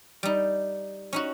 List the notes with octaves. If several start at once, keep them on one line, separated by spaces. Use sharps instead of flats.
G3 D#4
C#4 D#4 F#4